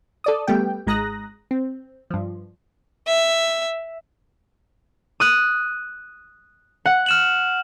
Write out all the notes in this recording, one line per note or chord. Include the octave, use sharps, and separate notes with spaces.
A4 D5 D#6
G3 A3 B3 G4 G5
G#1 G#3 A#5 D#6 F#6 A#6
C4
G2 F3
E5
D#6 F#6
F#5
F6 E7 F#7